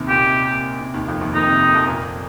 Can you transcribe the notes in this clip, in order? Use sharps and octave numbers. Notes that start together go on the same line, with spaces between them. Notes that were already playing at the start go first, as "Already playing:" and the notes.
Already playing: D#2 C3 D#3
A#2 G4
C3
C3
D#2 D#3
F2 F3
D#2 D#3
D#2 D#3 D#4
C3
F2 F3
A#2 A#3